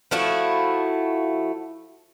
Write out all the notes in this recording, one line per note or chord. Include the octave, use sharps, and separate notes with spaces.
F3 A3 E4 F#4